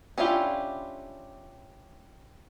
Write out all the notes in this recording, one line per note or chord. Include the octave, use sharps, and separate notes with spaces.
C#4 D4 E4 F4 G4